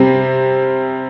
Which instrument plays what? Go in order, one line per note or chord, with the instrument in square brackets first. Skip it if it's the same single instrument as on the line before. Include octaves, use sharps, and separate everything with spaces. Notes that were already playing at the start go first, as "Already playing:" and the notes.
Already playing: [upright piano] C3 G3 C4